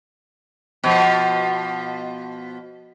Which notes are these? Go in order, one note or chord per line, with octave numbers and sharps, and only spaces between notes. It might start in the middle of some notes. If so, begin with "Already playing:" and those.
B2 F3